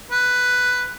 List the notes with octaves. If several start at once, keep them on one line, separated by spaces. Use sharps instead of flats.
B4